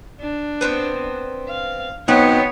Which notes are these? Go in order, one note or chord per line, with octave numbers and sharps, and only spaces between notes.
D4
B3 C4 C5
F5
B2 F#3 B3 C4 D#4 C#5